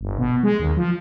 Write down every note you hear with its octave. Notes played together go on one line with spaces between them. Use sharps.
G1
B2
G#3
D#2
F3